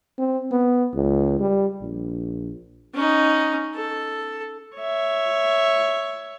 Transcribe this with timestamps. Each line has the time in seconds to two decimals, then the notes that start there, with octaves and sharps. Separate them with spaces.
0.18 C4
0.52 B3
0.94 C#2
1.40 G3
1.82 A#1
2.94 C#4 D#4
3.74 A4
4.77 C#5 E5